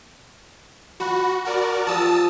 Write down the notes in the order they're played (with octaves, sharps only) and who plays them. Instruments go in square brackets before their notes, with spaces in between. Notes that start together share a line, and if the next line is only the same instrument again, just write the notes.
[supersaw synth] F#4 [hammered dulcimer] A5 B5 C#6
[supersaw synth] F#4 A#4 D5
[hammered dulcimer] F3 G4 [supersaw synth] A5 D#6 E6